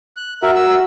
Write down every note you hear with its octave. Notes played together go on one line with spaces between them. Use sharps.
F#6
F#4 A#4 E5
E6